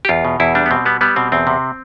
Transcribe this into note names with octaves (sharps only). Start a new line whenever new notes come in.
G4
E2 F4
B2
E2 E4
G3 D4
B3
B2 C4
G3 B3
G3 B3
B2 C4
E2 C4
C3